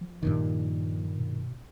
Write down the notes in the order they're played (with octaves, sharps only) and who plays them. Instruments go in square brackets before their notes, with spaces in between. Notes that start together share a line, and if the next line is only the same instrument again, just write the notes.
[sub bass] F3
[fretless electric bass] G2 A#2 D#3
[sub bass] B2